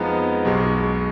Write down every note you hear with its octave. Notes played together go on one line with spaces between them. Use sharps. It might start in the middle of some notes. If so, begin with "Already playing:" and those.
Already playing: F2 F3 G#3 B3 D#4
B1 B2 G#3